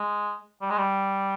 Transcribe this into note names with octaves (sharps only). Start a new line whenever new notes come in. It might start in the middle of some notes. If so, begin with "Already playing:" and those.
Already playing: G#3
G3
G#3
G3